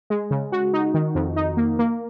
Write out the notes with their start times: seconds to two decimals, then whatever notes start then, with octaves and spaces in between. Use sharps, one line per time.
0.10 G#3
0.31 C#3
0.52 F#4
0.73 D#4
0.94 D#3
1.15 F2
1.36 D#4
1.57 A#3
1.79 A#3